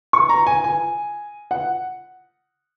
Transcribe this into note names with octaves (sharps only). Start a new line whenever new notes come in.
C#6
A#5
G#5
G#5
F#5